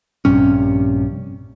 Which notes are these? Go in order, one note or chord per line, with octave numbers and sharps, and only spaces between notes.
A#1 G2 C3 C#4